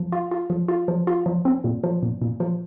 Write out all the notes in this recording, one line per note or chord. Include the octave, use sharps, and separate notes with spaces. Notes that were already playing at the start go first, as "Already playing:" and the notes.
Already playing: F3
F4
F4
F3
F4
F3
F4
F3
C4
A#2
F3
A#2
A#2
F3